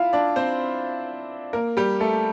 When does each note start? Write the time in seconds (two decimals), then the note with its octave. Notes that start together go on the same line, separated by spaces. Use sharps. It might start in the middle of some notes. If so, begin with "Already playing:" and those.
Already playing: E4 F4 F5
0.13 D4 D5
0.36 C4 C5
1.53 A#3 A#4
1.77 G3 G4
2.00 A3 A4